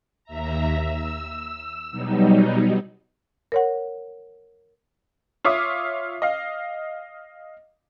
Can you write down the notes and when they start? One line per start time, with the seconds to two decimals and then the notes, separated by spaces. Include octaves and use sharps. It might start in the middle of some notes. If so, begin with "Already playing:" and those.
0.24 D#2 E5 A#5
0.76 E6
1.91 B2 F#3 G3 D#4
3.52 A#4 C#5 F#5
5.45 F4 C#5 E5 D6 D#6
6.22 D#5 F5